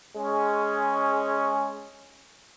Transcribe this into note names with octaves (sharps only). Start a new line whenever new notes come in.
G#3 C#4